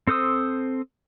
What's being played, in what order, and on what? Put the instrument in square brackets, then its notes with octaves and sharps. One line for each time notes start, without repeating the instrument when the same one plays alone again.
[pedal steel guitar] C4 A4 C5 D#6 E6